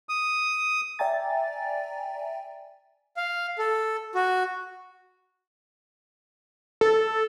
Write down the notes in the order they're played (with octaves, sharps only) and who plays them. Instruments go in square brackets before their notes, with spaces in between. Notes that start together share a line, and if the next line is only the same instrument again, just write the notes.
[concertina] D#6
[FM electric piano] D5 E5 G5 G#5 A#5 A6
[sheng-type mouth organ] F5
A4
F#4
[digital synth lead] A4